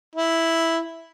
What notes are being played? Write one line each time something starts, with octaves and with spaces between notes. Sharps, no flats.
E4